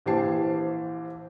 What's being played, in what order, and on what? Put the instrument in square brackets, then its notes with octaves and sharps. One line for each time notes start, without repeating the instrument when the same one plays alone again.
[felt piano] A#1 E3 G4 C5 A5 C7